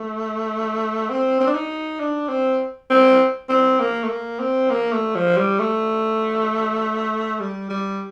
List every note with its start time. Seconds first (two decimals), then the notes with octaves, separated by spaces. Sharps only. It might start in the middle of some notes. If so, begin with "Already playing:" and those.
Already playing: A3
1.10 C4
1.40 C4
1.47 D4
1.55 D#4
2.00 D4
2.29 C4
2.90 C4
3.49 C4
3.80 A#3
4.04 A3
4.10 A#3
4.39 C4
4.70 A#3
4.92 A3
5.15 F3
5.37 G3
5.59 A3
7.40 G3
7.70 G3